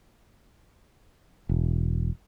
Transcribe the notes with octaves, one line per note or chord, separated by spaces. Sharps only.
E1